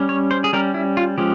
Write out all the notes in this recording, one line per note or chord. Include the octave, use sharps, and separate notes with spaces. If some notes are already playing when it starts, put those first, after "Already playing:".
Already playing: G3 C#4
C#5
C5
G#4
G3 C#4 A#4
E4
F4
F3 G#3 C#4 G4